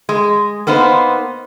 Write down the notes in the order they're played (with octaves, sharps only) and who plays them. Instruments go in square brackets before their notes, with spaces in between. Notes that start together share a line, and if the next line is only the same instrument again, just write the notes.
[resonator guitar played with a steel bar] G#3
A#3 B3 D#4 C5